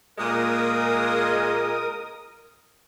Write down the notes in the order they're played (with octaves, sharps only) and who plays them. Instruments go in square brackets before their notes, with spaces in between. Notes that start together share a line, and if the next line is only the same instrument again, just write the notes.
[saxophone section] A#2 G#3 [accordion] A#4 D#6